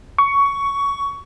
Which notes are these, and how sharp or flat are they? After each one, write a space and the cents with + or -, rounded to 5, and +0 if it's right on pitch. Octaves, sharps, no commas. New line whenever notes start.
C#6 +15